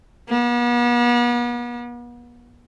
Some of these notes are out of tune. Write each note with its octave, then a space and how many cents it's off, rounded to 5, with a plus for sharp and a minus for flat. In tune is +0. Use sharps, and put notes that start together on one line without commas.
B3 -40